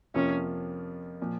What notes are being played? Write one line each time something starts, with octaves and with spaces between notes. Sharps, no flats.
F2 C3 F3 A#3 C#4 F4
A#2 F3